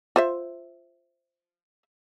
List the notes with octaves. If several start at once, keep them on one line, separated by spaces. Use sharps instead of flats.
F4 C5 E5